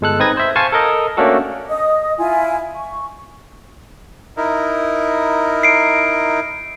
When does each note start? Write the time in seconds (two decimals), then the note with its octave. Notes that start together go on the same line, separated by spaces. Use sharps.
0.01 G1 G#3 A4 F#6
0.19 C4 D#4 B4 D#6 G#6 A#6
0.37 C5 E5
0.56 C5 F5 G#5 A5 C#6
0.72 A4 A#4 D#5
1.17 A3 A#3 C#4 D4 F#4 A4
1.69 D#5 D#6
2.18 E4 F4 G#5
2.76 C#6
4.37 D#4 E4 A#4
5.63 C7 D7